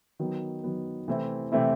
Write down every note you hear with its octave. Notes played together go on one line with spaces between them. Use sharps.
D#3 F#3 B3
D#3 F#3 B3
C3 E3 A3 C4 E4
C3 E3 A3 C4 E4